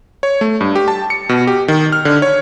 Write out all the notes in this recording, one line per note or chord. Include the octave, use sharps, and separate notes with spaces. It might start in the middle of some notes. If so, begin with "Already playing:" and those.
C#5
A3
G2
G4
A5
C#7
B2
G4
D#3
F6
D3
C#5